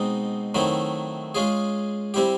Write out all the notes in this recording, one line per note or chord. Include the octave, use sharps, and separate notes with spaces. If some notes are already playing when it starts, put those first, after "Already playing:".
Already playing: B2 G#3 C4 D#4
D#3 F#3 A3 C4 E4
G#3 C#4 F4 G#4
G3 C4 E4 G4